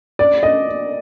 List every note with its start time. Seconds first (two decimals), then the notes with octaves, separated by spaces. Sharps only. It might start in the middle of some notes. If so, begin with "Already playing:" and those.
0.19 D5
0.43 D#5